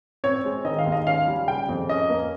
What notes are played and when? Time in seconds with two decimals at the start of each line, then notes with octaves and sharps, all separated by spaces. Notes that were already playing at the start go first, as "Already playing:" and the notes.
0.24 C4 C#5
0.45 G#3
0.65 D#3 D#5
0.79 F5
0.86 D#2
0.92 D#5
1.07 C#4 F5
1.27 G3
1.48 C#3 G5
1.69 F2
1.89 C#4 D#5
2.10 A#3